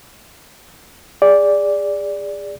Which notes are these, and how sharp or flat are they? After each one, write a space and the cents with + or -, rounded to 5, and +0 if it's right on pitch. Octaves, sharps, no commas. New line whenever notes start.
G#4 -25 D5 -10